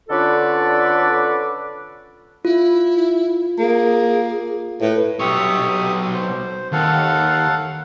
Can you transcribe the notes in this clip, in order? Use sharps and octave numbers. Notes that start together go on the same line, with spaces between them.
D3 C#4 F4 A4 B4 D5
E4 F4
A#3 G#4
A2 B4
B1 G4 C#5 E5 D#6
C5
D#2 A4 F5 F#5